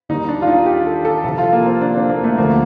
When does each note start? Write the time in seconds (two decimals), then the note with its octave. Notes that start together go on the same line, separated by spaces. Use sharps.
0.09 D#2 D#3 G3 D#4
0.28 D4
0.42 F4
0.47 D#4
0.66 G4
0.86 A4
1.05 A4
1.24 C2 C3 F3 A4
1.38 F4
1.53 A#3
1.66 C4
1.81 D4
1.95 C4
2.10 A#3
2.24 A3
2.38 D2 D3 F3 A#3